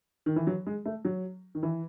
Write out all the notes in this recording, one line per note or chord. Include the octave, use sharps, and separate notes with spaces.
D#3
E3
F#3
G#3
A3
F#3
D#3
E3